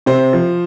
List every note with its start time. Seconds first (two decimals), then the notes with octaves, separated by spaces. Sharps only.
0.06 C3 C5
0.33 F3